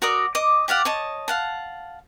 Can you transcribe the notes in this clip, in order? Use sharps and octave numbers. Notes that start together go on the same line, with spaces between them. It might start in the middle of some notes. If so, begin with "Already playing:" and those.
F#4 A#4 D5 D#6
D#5 D6
G4 D5 F5 F#5
C#5 D#5 A5
F5 F#5 A5